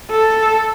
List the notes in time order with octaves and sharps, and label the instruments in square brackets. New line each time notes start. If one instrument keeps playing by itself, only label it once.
[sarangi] A4